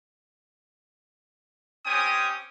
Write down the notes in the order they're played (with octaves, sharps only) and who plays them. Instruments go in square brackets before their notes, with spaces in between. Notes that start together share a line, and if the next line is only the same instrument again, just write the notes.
[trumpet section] C4 C#4 G4 G5 G#5 D#6